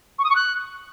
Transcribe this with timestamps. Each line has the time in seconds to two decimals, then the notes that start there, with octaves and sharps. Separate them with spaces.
0.18 C#6
0.24 D#6
0.30 C#6
0.35 F#6